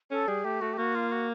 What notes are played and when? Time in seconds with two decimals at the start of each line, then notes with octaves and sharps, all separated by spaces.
0.11 C#4 A4
0.27 G3 G#4
0.45 A3 G4
0.61 A3 F#4
0.73 G4
0.78 A#3 F#4
0.95 F4
1.12 F#4